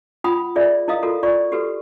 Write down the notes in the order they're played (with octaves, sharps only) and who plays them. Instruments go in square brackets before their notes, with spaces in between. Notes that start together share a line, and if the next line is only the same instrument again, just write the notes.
[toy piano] F4 F#5 G5 B5 D#6
F4 G#4 A#4 D5 E5
E4 A#4 D#5 F5 D#6
F4 F#4 A4 A#4
F4 D5 C#6
F#4 G4 A4 B4